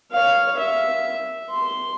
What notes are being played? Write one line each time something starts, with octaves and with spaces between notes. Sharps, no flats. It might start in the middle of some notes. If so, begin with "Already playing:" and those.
C#5 F5
E5
C6